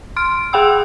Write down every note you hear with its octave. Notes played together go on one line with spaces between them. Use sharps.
C6 F6 D7
G#4 F#5 G5 B5 E6